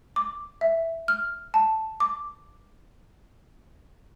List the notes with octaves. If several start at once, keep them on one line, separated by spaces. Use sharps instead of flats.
D6
E5
F6
A5
D6